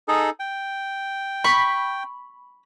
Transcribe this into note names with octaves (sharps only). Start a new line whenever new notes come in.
D#4 G#4 A4
G5
B5 C#6